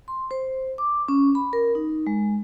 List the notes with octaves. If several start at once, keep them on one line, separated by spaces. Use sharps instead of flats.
C6
C5
D6
C#4
B5
A#4
D#4
G#3